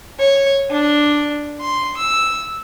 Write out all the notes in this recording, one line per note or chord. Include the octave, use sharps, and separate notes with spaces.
C#5
D4
C6
E6